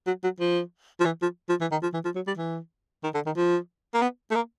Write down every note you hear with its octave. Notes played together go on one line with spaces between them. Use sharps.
F#3
F#3
F3
F3
E3
F3
F3
E3
D#3
F3
E3
F3
F#3
G3
E3
D#3
D3
D#3
F3
A#3
B3
A3
A#3